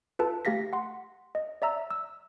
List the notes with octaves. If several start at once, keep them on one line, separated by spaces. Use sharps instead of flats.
F4 A4 B4 A5
A3 G4 F5 A#6 B6
F#5 C6
D#5
D5 E5 A#5 E6
E6